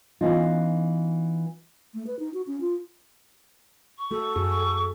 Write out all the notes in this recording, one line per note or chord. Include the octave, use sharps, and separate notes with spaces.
E3 B3 C#4 D#4 F4
A3
B4
D#4
F#4
C#4
F4
C#6
A3 F#4 A4
F#2 F#4 G#4
C#6